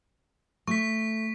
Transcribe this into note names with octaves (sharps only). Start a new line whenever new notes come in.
A3 C#6 B6